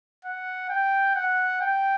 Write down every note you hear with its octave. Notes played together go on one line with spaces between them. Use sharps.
F#5
G5
F#5
G5